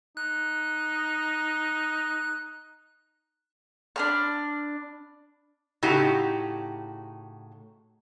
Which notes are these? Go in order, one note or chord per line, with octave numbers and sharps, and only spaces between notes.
D#4 F#6
D4 B5 F6
A2 C#3 D#4 F#4 G4